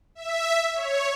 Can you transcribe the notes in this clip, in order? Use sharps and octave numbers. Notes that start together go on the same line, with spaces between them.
E5
C#5